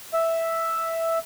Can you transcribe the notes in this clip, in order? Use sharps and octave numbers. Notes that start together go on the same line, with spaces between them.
E5